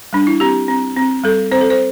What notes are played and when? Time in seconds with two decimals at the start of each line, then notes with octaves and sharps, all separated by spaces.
0.13 G3 D4
0.27 E4
0.40 C4 G4
0.68 C4
0.96 C4
1.24 G3 A4
1.51 C4 C5
1.61 A4
1.70 C5